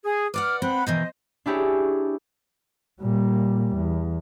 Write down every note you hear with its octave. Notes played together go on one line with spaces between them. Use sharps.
G#4
B4 D5 F#5 D6 F6
C4 F#5 B5
B2 D#3 E3 C5 D#5
D4 E4 G4 G#4 C#5
A#2 G3
E2